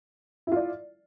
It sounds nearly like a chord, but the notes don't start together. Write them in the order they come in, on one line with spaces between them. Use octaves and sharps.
E4 F4 D5